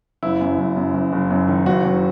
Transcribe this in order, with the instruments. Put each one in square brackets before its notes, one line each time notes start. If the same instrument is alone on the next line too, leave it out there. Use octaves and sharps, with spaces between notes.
[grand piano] F#1 E4
F#2
F#1
F#2
F#1
F#1
F#2
D#3
F#1 F#4
F#1